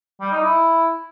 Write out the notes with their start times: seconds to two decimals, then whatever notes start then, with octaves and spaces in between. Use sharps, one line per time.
0.21 G3
0.32 D#4
0.43 E4